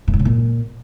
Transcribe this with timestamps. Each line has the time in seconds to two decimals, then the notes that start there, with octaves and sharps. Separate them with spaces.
0.08 A2
0.13 G#2
0.19 C#3
0.25 A#2